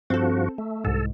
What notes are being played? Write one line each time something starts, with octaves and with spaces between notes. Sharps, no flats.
G2 F3 C4 F#4 A4
A3
C2 G#2 A4